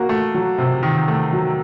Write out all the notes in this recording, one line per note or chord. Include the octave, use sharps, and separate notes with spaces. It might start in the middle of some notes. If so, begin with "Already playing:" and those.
Already playing: A#3 F#4
A3
F#3
C3
D#3
A3
F#3